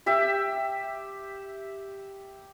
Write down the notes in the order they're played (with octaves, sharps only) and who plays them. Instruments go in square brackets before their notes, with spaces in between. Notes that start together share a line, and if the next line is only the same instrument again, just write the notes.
[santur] G4 E5